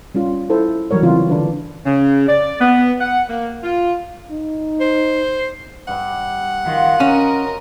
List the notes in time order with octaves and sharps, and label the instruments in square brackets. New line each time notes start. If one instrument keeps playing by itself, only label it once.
[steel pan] G3 C#4 F4
E4 A4 C5
E3 F#3 G3 A#4 C#5
C#3 E3 C4 F4
D3 D4 B4
[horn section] C#3
D5
B3
F#5
A#3
F4
[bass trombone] D#4
[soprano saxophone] C5
[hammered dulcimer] G2 G3 [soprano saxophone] F#5
[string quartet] D#3 [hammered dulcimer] F4 F#4
[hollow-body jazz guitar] C#4 [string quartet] A#4 D#5